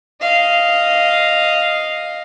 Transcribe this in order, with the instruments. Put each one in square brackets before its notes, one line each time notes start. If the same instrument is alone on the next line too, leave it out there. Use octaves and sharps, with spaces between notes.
[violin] D#5 F5